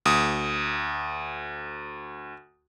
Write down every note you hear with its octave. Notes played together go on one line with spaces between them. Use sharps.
D2 D#6